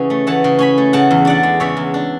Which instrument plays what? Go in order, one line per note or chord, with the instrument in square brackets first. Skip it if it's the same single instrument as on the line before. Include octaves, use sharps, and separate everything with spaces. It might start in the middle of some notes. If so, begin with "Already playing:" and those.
Already playing: [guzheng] C#3 E3 C#4 F#5
A3
E3 F#5 A5
C#3
C#4 G#5 B5
A3
C#3 F#5 A5
E2
D4 D5 F#5
G#3
C#3 C#5 E5
E2
D4